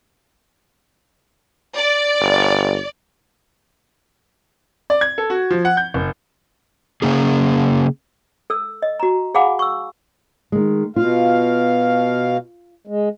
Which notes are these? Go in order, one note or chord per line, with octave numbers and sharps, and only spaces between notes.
D5
G1
D5
G#6
A4
F#4
F3
F#5
G6
F#1
C#3 A#3 C#4 G#4
A4 E6
D#5
F#4 A#5
G#4 F5 F#5 G#5 B5 D6
C#6 E6
D#3 G#3
B2 F4 F5
G#3